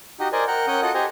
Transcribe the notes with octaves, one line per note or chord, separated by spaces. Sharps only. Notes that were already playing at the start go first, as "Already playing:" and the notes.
D#4 F#4 G4 D#5
A#4 C5 D5 D#5 G#5
A#4 F#5 G5 A#5
C#4 A#4 F#5 G5 D#6 G6
F4 F#4 A4 D#5 F#5 D#6
G4 C5 D#5 G#5 A#5